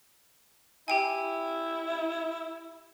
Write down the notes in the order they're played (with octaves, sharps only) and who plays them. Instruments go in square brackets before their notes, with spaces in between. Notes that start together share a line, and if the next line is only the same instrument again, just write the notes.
[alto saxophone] E4 [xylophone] G4 G5 G#5